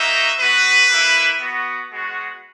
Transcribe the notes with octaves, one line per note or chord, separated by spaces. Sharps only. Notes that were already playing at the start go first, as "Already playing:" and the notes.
Already playing: A#3 D#4 F#4 E5
B3 F#4 B4
A#3 E4
B3 F#4
G#3 B3 F#4